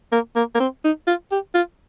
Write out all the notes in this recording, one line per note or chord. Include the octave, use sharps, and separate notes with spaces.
A#3
A#3
A#3
C4
D#4
F4
G4
F4